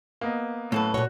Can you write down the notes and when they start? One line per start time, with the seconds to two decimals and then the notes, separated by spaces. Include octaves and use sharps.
0.21 A#3 B3 D#5
0.72 F#2 A2 A4 B4
0.94 A#2 F#4 C#5 F#6